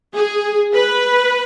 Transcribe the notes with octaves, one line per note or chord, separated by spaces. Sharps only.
G#4
B4